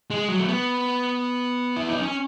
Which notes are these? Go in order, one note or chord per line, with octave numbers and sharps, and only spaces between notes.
G#3
F#3
A3
B3
E4
D#4
C#4